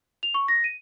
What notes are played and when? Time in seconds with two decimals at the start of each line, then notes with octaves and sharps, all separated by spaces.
0.23 F7
0.34 C#6
0.48 A#6
0.64 D#7